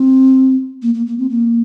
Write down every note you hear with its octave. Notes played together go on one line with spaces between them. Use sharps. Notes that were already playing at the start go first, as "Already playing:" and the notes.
Already playing: C4
A#3
A#3
A#3
C4
A#3